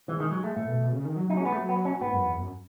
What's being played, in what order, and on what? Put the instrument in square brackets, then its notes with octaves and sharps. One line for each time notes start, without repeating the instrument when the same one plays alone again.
[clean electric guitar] E3 [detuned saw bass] G#3
[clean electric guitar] D#3
F#3
A3
[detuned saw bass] A2 [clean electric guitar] A3
[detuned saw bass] B2
B2
C#3
D#3
F#3
[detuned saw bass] F#3 [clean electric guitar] D#4
[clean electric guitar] C#4
[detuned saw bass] G#3 [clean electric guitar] B3
[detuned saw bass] F#3 [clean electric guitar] A3
[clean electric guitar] B3
C#4
[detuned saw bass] G#2 [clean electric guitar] B3
[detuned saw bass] F#2
E2
F#2